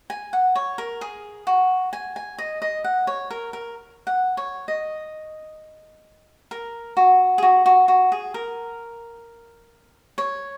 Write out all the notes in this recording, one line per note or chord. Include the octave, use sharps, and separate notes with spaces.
G#5
F#5
C#5
A#4
G#4
F#4
G#5
G#5
D#5
D#5
F#5
C#5
A#4
A#4
F#5
C#5
D#5
A#4
F#4
G#4
F#4
F#4
F#4
G#4
A#4
C#5